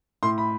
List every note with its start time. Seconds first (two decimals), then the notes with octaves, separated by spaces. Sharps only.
0.23 A2 C6
0.38 B5